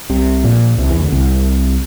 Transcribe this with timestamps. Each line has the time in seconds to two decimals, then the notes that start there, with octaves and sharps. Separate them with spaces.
0.10 C2 C3
0.44 A#1 A#2
0.78 C2 C3
0.89 E2 E3
1.00 D2 D3
1.12 C2 C3